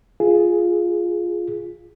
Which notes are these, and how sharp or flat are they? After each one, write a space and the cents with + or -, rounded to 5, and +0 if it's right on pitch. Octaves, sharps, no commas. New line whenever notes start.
F4 +0 G#4 +0